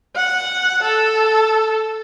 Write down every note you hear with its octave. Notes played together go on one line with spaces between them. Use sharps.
F#5
A4